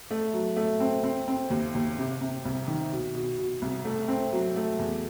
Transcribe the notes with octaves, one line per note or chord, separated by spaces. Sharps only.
A3
F#3
A3
C4
C4
C4
D#2
D#2
C3
C3
C2
D#3
B2
B2
B2
C2
A3
C4
F#3
A3
E2